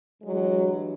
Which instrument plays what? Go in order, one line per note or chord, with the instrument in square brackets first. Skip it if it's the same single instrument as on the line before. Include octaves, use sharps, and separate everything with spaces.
[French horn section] G2 E3 F#3 G#3